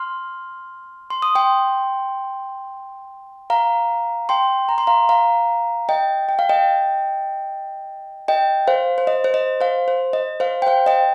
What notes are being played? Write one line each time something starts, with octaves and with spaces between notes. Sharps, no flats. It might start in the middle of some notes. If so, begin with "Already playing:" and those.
Already playing: C6 F6
C6
D#6
G5 C6
F5 A#5
G5 C6
A#5
C6
F5 A#5
F5 A#5
D#5 G5
G5
F5
D#5 G5
D#5 G5
C5 F5
C5
D#5
C5
D#5
C5 F5
C5
D#5
C5 F5
G5
C5 F5
D#5 G5